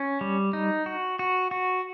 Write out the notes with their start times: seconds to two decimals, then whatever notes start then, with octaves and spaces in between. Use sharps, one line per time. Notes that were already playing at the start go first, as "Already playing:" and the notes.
Already playing: C#4
0.21 G3
0.53 D#4
0.86 F#4
1.19 F#4
1.51 F#4